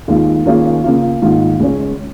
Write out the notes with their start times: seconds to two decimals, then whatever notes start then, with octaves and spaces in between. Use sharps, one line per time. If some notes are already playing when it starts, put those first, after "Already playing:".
0.08 D#2 D#3 G#3 F4
0.46 D#3 A#3 C#4 F4 G#4
0.84 C#3 A#3 F4
1.22 G#2 D#3 A#3 F4
1.60 C#2 C#3 G#3 C#4